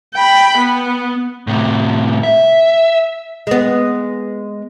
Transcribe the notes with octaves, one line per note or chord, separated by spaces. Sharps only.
G5 B5
B3
A2 C3
E5
G#3 B3